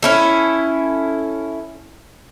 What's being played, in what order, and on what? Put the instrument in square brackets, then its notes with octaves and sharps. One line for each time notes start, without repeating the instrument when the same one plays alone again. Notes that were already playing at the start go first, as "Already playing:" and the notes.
[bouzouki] C#4 E4 A4